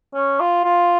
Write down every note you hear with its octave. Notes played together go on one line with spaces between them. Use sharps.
C#4
F4
F4